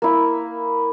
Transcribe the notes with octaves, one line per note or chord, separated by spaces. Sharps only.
A#3 E4